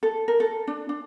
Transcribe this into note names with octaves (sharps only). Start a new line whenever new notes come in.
A4
A#4
A4
D4
D4